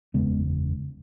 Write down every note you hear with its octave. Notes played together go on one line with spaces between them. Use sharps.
F#1 E2 C#3 G#3 B3